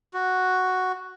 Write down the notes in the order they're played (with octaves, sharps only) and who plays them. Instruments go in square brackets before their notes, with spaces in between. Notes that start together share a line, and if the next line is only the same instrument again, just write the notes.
[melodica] F#4